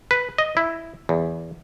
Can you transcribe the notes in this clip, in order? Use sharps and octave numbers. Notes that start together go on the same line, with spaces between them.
B4
D#5
E4
E2